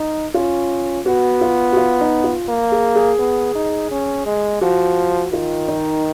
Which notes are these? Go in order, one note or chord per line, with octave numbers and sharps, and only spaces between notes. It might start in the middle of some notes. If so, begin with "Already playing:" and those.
Already playing: D#4
C#4 F4
B3 F#4
F4
F#4
F4
D#4
F4
A#3
G#4
G#4
B3
D#4
C#4
G#3
F3 F#4
D#3 F4
D#4